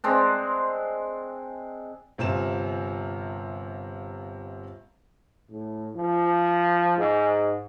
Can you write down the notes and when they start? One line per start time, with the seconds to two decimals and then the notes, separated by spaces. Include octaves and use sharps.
0.04 G#3 C4 D4
2.18 G1 C3 F4 G#5 E7
5.50 A2
5.95 F3
6.97 G#2